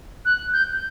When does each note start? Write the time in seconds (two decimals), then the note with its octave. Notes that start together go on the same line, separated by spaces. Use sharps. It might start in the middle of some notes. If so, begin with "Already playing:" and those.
0.25 F#6
0.53 G6